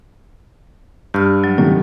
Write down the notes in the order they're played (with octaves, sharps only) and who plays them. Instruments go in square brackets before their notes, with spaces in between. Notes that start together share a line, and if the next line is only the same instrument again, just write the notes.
[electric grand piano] G2 [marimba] G4 F6
[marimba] F#3
[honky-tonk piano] A2 C3 D#3 [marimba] F#3